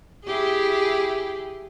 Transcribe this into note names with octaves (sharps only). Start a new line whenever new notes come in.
E4 G4 G#4